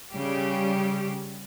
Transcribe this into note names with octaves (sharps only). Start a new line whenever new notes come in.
C#3 G3 G4